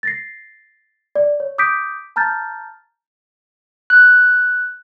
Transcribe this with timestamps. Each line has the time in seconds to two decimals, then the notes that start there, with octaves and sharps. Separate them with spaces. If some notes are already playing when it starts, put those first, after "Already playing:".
0.03 A6 A#6 C7
1.15 D5
1.40 C#5
1.58 D6 D#6 G6 B6 D7
2.16 A5 A#5 F6 G6 A6
3.90 F#6